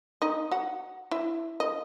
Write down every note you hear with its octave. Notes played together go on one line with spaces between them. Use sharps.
D#4 D#5
F#4 F#5
E4 E5
D#5